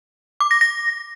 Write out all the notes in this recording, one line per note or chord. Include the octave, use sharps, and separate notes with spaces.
D6
A#6
A#6